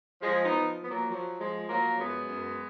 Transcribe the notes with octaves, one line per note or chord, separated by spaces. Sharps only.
F3 G#3
B3 D#4
F3
F3 B3
F#3 A#3
F3 F#3
F3 G#3
F3 F#3 A#3
F#2 G#3 B3
F#2